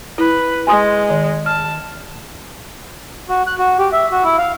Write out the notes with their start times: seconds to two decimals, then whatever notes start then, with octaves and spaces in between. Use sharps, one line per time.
0.18 E4 B4
0.67 G#3 G#5 C6 D#6
1.10 D#3
1.46 A5 F6
3.29 F#4
3.47 F#6
3.58 F#4
3.78 G4
3.93 E5
4.11 F#4
4.24 E4
4.38 F5